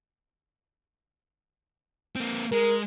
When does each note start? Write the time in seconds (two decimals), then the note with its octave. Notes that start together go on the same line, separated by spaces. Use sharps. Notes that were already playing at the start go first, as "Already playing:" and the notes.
2.16 A#3 C4
2.52 G#3 A#4